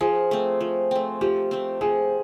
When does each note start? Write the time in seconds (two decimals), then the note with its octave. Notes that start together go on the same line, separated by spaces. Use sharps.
0.01 F3 G#4
0.31 A3 C4
0.61 F3
0.91 A3 C4
1.21 F3 G4
1.51 A3 C4
1.81 F3 G#4